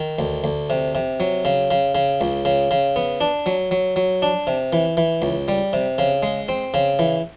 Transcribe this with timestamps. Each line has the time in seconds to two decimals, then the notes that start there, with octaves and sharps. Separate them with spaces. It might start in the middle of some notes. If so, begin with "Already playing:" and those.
Already playing: D#3
0.19 D2
0.44 D2
0.70 C3
0.95 C3
1.20 F#3
1.45 C#3
1.71 C#3
1.95 C#3
2.21 C#2
2.45 C#3
2.71 C#3
2.96 B3
3.21 D4
3.46 F#3
3.71 F#3
3.96 F#3
4.22 D4
4.47 C3
4.73 E3
4.97 E3
5.22 C#2
5.48 G3
5.73 C3
5.98 C#3
6.23 G#3
6.49 C4
6.74 C#3
6.99 E3